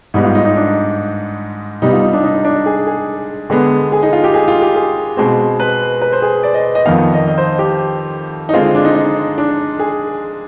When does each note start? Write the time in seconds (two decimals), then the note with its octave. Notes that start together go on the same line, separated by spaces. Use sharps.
0.14 G#2 G3 B3 D#4
0.25 F4
0.35 D#4
0.45 D#4
0.56 D4
1.82 C3 G3 B3 D#4
1.93 F4
2.02 D#4
2.13 D4
2.24 D#4
2.34 D#4
2.45 D4
2.66 G#4
2.87 G#4
3.50 D3 G#3 B3
3.92 G#4
4.03 D#4
4.13 F4
4.24 G4
4.34 G#4
4.48 F4
4.62 G4
4.76 G#4
5.17 B2 G#3 C4
5.60 B4
6.02 B4
6.13 C5
6.22 G#4
6.43 D5
6.54 D#5
6.75 D#5
6.86 F2 D#3 B3 F5
7.14 D#5
7.28 D#5
7.38 C5
7.59 G4
8.49 D#4
8.53 D3 G#3 C4 F4
8.75 D4
8.85 D#4
8.95 D#4
9.38 D4
9.79 G#4